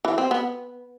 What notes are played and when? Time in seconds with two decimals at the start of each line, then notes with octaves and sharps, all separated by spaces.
0.05 E3
0.18 C4
0.31 B3